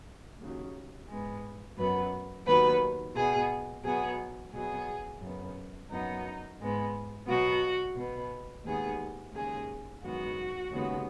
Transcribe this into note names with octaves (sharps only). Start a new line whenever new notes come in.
D#2 C#3 F#3
G#2 G#3 B3
F#2 F#3 B3 B4
D#2 D#3 F#3 B3 B4
B2 B3 G#4
B2 F#3 B3 G#4
B2 F#3 B3 G#4
F#2 C#3 B3
F#2 F#3 B3 D#4
G#2 G#3 B3
B2 F#3 B3 F#4
B2 B3
D#2 D#3 G#3 B3 G#4
D#2 C#3 G#3 G#4
F#2 D#3 G#3 B3 F#4
D#2 C#3 G#3 B3